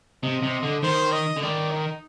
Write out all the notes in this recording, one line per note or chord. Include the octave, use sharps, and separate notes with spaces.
C3 D#5
C3
D3
D#3 C5
D#5
D3
D#3 D5
D#4